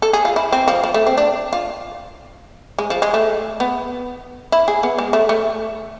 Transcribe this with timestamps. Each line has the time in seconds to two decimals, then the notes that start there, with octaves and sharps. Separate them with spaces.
0.02 A4
0.13 G#4
0.25 F4
0.36 E4
0.53 C4
0.68 F3
0.84 F3
0.94 A3
1.07 C4
1.18 D4
1.53 F4
2.79 G#3
2.90 F3
3.02 G#3
3.14 A3
3.60 B3
4.52 E4
4.68 G#4
4.83 B3
4.99 G#3
5.13 A3
5.29 A3